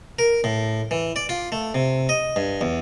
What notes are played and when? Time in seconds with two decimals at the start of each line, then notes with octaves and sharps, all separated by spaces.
0.19 A#4
0.44 A2
0.91 E3
1.16 D5
1.29 F4
1.52 A3
1.75 C3
2.09 D#5
2.36 G2
2.61 E2